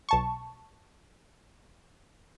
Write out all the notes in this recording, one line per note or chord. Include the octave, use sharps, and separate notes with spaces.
B1 A5 C#6